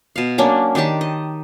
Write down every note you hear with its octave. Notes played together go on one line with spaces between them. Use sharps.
B2 F5
F#3 A#3 C#4 D4
D#3 D4 G4 A5
D#5